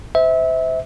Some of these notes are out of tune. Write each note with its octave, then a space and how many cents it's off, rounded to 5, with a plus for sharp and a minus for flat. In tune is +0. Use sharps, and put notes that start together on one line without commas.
C5 -30 E5 -25